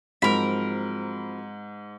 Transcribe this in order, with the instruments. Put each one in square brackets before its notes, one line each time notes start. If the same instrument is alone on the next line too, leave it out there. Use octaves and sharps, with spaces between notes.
[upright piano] G#2 [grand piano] F3 F#3 C4 [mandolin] A#4 B5